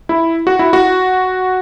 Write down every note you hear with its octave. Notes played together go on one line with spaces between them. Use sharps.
E4
F#4
E4
F#4